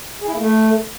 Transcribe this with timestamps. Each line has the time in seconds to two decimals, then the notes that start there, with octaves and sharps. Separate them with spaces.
0.22 G#4
0.28 E4
0.33 A#3
0.39 A3